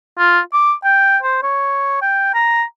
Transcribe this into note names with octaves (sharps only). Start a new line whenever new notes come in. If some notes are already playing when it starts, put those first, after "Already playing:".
F4
D6
G5
C5
C#5
G5
A#5